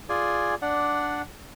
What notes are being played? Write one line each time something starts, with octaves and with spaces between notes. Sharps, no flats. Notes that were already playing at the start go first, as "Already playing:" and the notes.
F4 G#4 D5 G#5
D4 D5 F#5